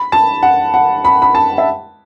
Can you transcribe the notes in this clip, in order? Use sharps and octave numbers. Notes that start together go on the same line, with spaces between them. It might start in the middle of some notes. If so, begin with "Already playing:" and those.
Already playing: B5
A5
F#5
F#5
B5
B5
A5
E5